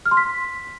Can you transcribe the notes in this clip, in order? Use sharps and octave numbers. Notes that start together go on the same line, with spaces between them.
F6
C6
B6